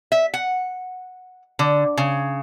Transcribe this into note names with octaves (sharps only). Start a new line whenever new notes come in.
E5
F#5
D3
C#3